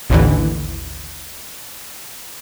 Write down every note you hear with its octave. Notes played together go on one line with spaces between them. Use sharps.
A1 D#2 D3 E3